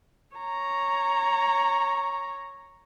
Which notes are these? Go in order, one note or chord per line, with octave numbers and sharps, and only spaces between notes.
C#5 A#5